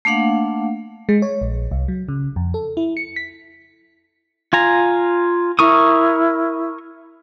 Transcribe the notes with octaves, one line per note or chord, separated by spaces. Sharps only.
A3 A#3 D4 F5 F#5
G#3
C#5
A#1
C2
F#3
C#3
F2
A4
E4
C#7
B6
F4 G#5 A#5
E4 A#4 C#6 D#6